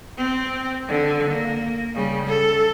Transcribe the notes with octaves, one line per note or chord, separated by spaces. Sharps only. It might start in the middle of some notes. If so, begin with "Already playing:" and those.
C4
D3
A#3
C#3 G3
A4